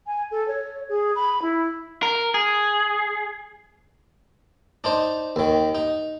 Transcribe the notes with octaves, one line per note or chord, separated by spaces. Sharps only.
G#5
A4
C#5
G#4
B5
E4
A#4
G#4
D4 D#4 C5
D#2 D#3
D#4